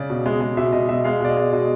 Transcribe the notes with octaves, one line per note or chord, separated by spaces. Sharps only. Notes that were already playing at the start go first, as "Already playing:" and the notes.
Already playing: C#3 D5
B2
G#3
G#3
B2 E5
B2 D#5
B2 E5
G#3 F5
B2 D5
D#5
G#3
B2 D#5